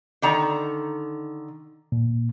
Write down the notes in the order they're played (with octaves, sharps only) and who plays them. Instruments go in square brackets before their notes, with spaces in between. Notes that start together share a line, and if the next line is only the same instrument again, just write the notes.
[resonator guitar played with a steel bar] D3 D#3 A#5
[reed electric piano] A#2